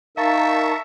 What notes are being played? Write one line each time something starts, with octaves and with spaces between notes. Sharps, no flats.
D#4 A#4 E5 F5 A5 A#5 C#6 A6